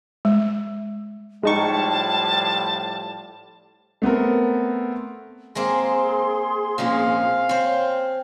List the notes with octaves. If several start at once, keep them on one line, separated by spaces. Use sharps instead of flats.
G#3
A2 F3 G3 G#3 D#4 A5 C#6
A3 B3 C4 A#4
G#3 A#3 C4 G#4 C6
A#2 F3 G#3 C4 C#4 F5
C4 C5 C#5